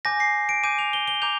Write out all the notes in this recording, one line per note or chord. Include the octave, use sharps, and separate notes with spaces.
G#5 D6 G6 A#6
C7
D7
G#5 D6 G6 D#7
F7
G7
G7
A#5 D6 G6 F7